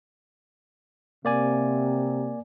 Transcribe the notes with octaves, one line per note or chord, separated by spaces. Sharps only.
C3 A#3 D5 G#5